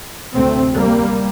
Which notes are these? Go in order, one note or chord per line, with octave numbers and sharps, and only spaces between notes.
D2 C3 A3 C4
G3 A#3